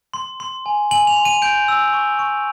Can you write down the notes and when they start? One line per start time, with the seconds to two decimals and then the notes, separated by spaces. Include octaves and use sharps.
0.14 C6
0.40 C6
0.66 G#5
0.91 G#5 F#7
1.07 F7
1.16 C6
1.25 D#7
1.42 G6 D7
1.68 E6
1.93 C#6
2.19 C#6